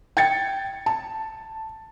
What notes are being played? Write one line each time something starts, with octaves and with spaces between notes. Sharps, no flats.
G5 G#6 A6 C#7
A5